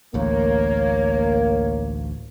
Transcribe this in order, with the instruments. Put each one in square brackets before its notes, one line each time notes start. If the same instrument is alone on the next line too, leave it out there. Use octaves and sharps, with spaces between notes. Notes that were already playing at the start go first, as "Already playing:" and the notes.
[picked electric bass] A1 D2 [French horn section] A#3 [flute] C#5